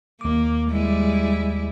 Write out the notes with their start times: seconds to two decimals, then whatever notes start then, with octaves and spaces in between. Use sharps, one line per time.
0.21 D#2 A#3 D6
0.70 G3 G#3 E4